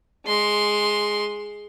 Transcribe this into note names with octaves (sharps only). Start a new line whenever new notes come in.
G#3 C6